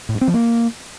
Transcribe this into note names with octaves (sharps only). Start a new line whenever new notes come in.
A2
G2
C4
F3
A#3